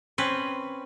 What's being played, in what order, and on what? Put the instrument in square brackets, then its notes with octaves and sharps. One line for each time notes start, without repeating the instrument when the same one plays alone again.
[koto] C4 C#4 B4